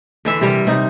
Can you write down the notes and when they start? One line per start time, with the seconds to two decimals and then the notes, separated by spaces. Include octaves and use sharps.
0.25 D3 E3 E5
0.41 C3 G3 A#4
0.67 C3 D#4